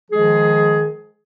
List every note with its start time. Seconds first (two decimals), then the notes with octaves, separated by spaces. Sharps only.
0.11 D#3 F3 G#3 G#4